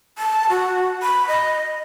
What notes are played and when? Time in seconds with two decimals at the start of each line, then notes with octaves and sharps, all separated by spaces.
0.18 A5
0.49 F#4
1.03 B5
1.28 D#5